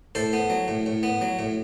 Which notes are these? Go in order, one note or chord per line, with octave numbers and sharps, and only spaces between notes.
A2 A4 C5
B3
F#3
A2
A2
B3
F#3
A2